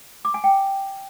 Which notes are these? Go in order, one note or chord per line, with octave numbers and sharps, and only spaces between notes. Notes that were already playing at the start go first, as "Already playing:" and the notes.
D6
G#5
G5